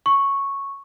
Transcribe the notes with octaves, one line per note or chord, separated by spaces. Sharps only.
C#6